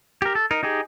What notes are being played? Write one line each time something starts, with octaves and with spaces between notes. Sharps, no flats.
G4 A#4
A4
D#4 A#4
D#4 G4 G#4